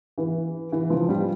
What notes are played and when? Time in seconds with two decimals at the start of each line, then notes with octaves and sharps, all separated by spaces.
0.18 E3
0.72 E3
0.90 F3
1.09 G3